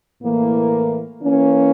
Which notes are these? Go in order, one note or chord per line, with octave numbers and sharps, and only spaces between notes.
A2 E3 A#3
E3 A#3 C#4